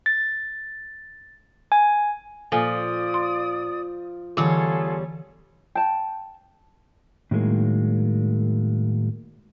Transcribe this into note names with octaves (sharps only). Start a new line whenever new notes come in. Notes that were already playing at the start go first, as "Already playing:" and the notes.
A6
G#5
A#2 F3 A4 D5 G#5 D#6
C6
E2 D3 E3 G3 F4 G#4 A4 C#5
G5 A5
A2 D#3 F#3 G#3 A#3